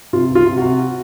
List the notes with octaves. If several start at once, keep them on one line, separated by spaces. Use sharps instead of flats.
C3 F4
C#2
F4
C3
C3 F#4